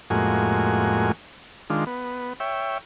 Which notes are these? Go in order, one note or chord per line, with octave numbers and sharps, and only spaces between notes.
F2 A2 G#3 A#3 F#4 G#5
D#3 G#3 D4 F4
B3
C#5 E5 G5